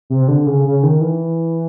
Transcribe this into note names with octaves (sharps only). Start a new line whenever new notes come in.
C3
D3
C#3
C#3
D#3
E3